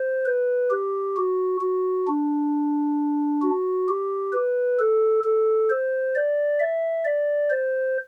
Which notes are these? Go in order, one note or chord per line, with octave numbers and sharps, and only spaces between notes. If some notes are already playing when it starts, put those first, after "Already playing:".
Already playing: C5
B4
G4
F#4
F#4
D4
F#4
G4
B4
A4
A4
C5
D5
E5
D5
C5